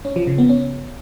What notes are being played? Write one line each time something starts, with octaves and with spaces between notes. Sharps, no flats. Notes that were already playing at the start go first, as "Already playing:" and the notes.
C#4
F3
C#3
B3
C#4